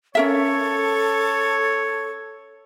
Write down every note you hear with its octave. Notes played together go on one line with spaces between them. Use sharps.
C#4 A4 A#4 C#5 E5